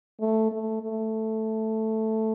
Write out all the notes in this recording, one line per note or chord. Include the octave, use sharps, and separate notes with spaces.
A3
A3
A3